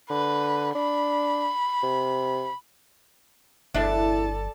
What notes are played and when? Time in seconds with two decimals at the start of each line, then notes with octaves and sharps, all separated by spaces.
0.10 D3 B4
0.75 D4 B5
1.83 C3
3.74 G1 E2 D4 E4 A4 D5 A5